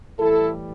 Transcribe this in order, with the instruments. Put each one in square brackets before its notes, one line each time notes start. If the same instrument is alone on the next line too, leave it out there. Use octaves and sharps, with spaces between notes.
[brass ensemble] A2 E3 G3 E4 A4